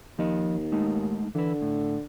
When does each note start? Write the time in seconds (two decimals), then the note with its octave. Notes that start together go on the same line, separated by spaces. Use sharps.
0.19 D#2 F3 D#5
0.72 G#3 A3 D#4
1.35 D3 E3 B4
1.62 A2